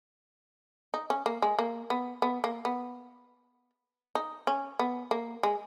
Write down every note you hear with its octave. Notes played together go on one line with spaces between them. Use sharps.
D#4
C#4
A#3
G#3
A#3
B3
B3
A#3
B3
D#4
C#4
B3
A#3
G#3